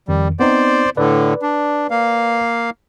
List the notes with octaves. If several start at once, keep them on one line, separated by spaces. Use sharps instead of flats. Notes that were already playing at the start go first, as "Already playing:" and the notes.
F2 D#3 G3
B3 C4 D#4 C5 D5
A2 D3 B4 D5
D4
A#3 F5